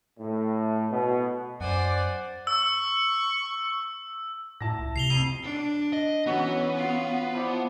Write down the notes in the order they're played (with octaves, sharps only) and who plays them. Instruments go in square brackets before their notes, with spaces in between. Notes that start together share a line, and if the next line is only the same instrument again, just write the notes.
[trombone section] A2
B2
[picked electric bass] F#2 [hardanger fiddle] C5 G#5 [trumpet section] D5 [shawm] F#5
[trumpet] C#6 [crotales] E6
[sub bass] A2 [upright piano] E4 A5 A#6
[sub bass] C#2
[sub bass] C3 [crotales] C7 F7 G7
[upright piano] F2 [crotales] C7 D#7
[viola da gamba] D4
[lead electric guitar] D#5
[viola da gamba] E3 C#4 [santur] F#3 F#4 [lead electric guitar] B3
[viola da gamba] F4
[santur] F3 E4 D5